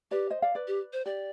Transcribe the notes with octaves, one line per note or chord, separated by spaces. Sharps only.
G4 B4 D5
C5 D#5
D5 F5
B4 D5
G4
C5
G4 D5